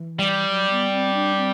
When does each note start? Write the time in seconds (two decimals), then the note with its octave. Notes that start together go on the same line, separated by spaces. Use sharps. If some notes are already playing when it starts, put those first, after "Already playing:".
Already playing: E3
0.19 G3
0.48 F#3
0.70 B3
0.92 C4
1.14 D4
1.36 C4